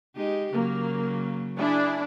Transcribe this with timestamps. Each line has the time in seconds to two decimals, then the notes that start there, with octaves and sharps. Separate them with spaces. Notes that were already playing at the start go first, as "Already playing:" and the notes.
0.17 G#3 D#4 G4
0.53 C#3 F#3 A#3
1.59 D4 E4 G#4